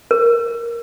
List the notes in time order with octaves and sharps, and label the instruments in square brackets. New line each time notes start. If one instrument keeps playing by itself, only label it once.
[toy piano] A#4